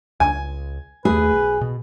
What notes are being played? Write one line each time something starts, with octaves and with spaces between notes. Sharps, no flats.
C#2 G#5
D#2 A3 G#4 B4
B1
B2